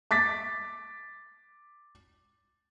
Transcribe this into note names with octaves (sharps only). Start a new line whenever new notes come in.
D6 A6 B6